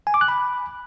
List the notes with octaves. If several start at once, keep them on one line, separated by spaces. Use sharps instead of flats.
G#5
D6
F#6
B5